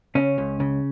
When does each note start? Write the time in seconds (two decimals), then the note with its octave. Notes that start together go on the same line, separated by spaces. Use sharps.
0.15 C#3 C#4
0.38 C#2
0.60 C#3